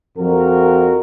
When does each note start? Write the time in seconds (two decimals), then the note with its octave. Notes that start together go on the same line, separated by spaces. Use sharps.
0.18 F2 F#4 A#4